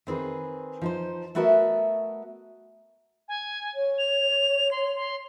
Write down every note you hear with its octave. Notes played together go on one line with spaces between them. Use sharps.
D#3 C4 G#4 B4
F3 D#4 C5
A3 B3 F#4 A#4 D#5 E5
G#5
C#5
F7
C6
C6